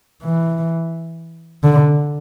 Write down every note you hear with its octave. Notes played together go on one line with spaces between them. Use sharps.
E3
D3